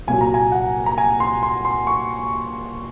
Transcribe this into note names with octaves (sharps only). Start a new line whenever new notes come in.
C2 A#2 F#3 G#5
A#5
G#5
F#5
A#5
G#5
C6
C6
C6
C#6